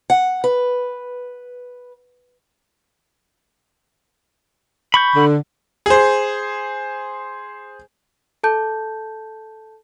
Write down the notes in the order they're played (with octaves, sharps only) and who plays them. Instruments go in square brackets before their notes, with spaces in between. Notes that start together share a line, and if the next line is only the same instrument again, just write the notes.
[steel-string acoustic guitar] F#5
B4
[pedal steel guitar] B5 C#6 G6
[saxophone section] D3
[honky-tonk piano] G#4 C5
[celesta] A4 A5 G6